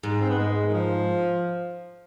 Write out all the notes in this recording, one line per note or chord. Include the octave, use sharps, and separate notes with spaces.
G#2
C4
B3
G#3
D#3
F3